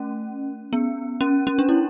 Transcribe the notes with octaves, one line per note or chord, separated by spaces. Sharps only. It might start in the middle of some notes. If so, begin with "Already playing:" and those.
Already playing: A3 C#4
B3
C#4
C#4
D4
E4